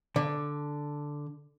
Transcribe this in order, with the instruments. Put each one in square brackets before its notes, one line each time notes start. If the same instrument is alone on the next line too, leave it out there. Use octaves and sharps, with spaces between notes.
[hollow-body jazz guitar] D3